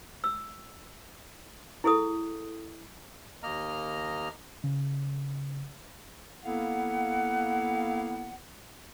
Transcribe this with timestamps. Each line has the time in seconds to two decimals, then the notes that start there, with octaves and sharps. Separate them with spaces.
0.24 E6
1.84 E4 G#4 A4 D#6
3.43 D#2 A#3 D#5 A#5 F6
4.64 C#3
6.44 A#3 B3 E4 A4 F5 F#5